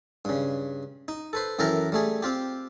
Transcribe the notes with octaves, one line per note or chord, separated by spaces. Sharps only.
G2 C#3
D#4
A4 B4 C5
F#2 E3 A4 A#4 G5 A#5
G3 A3 G#4
C4 F4 G4